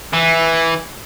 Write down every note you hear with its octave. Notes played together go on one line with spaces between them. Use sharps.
E3